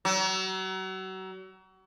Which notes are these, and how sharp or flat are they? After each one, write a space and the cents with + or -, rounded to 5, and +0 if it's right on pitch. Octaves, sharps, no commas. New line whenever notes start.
F#3 +35